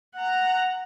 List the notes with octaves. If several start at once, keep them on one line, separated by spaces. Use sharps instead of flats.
F#5 A#5